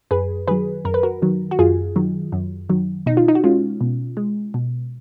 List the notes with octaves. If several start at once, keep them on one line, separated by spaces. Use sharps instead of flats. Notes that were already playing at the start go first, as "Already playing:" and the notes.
F#2 G#4 B4
D#3 F#3 G#4 B4
F#2 A#4
B4
F#4 A#4
D#3 F#3
F#4
F#2 F4 G#4
D#3 F#3
F#2
D#3 F#3
B2 D#4
F4
D#4
F#4
G#3 C#4 F4
B2
G#3
B2